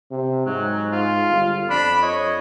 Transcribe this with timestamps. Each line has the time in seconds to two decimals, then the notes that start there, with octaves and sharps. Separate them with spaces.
0.11 C3
0.47 G#2 F#3
0.92 F4
1.29 G1 F5
1.70 F2 D4 B5
2.03 C#5 D#5